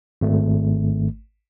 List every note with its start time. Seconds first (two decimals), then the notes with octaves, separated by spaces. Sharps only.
0.21 G#1 A3